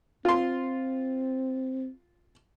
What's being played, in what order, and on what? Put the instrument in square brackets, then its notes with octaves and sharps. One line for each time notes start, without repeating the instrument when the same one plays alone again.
[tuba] C4 [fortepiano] F4 C6